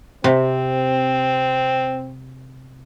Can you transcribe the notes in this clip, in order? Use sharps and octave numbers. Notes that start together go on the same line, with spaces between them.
C3 C4